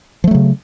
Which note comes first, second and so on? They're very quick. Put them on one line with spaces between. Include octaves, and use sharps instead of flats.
F3 A3 F#3 C#3